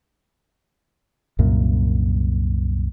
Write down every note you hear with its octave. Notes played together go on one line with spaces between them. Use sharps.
C2 F#2 A#2